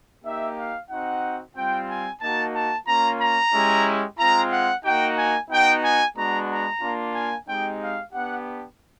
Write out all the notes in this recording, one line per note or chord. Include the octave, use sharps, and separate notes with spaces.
A#3 D#4 G4 E5
F5
C4 D#4 F#4 F#5
G3 C4 F4 G5
G#5
A#3 D#4 F#4 A5
A5
A#3 C#4 F4 A#5
A#5
G#3 C#4 E4 G4
G#3 C4 F4 A#5
F#5
A#3 D#4 F#4 G5
G#5
B3 D#4 F#4 G5
G#5
G#3 B3 D4 F#4 A#5
A#5
A#3 D4 F4
G#5
G#3 C4 D#4 G4 G5
F5
B3 D4 G4 F#5